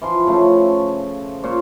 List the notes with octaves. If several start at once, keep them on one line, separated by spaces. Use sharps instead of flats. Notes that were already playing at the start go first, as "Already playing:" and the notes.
E3 F3 C6
C#3 F3 A3
A#2 C5 C#5